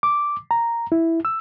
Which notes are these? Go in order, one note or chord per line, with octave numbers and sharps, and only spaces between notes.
D6
A#5
E4
E6